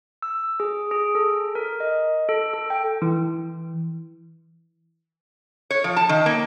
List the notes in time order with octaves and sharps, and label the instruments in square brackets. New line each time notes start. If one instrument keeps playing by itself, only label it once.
[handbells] E6
G#4
G#4
A4
A#4
D#5
A4
A4
G5
[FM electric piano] E3
[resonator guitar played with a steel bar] C#5
F3
A5
D#3
A#3